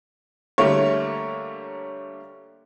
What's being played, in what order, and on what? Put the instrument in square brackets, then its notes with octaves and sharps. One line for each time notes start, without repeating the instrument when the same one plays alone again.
[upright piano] D3 G3 A3 A#3 C#5